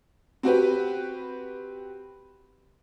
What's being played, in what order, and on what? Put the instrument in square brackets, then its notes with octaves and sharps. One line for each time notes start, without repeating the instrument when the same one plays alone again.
[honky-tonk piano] C4 F#4 G4 B4